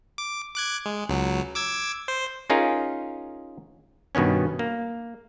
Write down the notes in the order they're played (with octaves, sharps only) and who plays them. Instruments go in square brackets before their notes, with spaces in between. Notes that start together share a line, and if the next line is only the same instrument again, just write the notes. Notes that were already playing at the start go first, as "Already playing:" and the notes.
[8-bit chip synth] D6
D6 F#6 G#6
G#3
C#2 F#3
D6 E6 G#6
C5
[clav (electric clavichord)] C#4 D#4 F4 G#4 A#4
G2 B2 D#3 B3 C#4
A#3